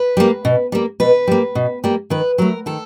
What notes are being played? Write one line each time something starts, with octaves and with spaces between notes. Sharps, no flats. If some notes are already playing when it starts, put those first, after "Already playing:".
Already playing: B4
G3 A#3
B2
G3 A#3
B2 B4
G3 A#3
B2
G3 A#3
D#3 B4
F#3 A3 A#4
D#3 A4